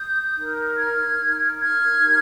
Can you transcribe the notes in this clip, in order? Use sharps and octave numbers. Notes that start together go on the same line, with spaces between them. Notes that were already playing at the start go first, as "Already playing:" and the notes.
Already playing: D#6 G6
D#4 A#4
F6 G#6
D#4 A#4
F6 G#6
D#4 G4 A#4